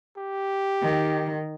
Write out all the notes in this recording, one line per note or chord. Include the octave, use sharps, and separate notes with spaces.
G4
D#3